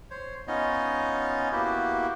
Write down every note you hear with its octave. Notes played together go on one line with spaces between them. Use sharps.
C5 C#5
B3 C#4 D#4 F4 C#5 D#5
A#3 B3 E4 F#4 G4